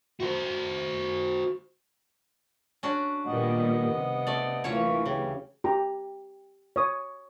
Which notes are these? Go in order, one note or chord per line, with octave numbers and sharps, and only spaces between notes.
F#4 C5
C#4 D4 F#4
A#2 D#3 G3 B3 D#5 F#5
C3
A3 D5
D2 E3 F#3 A#3 C#4 F4 C#5
C#3 G4
G4 A#5
C#5 D#6